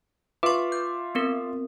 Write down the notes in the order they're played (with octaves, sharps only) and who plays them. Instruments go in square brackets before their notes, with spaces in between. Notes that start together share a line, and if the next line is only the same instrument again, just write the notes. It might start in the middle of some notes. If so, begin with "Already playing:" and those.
[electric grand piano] F4 E5 D6 [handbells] B4 C#6
[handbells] G6
B3 C4 A#4